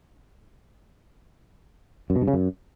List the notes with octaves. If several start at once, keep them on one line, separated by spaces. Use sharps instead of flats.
F#2
B2
G2
C#3
F#2